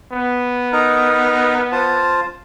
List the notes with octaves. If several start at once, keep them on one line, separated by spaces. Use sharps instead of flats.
B3
D#4 A#4
F4 C5 A5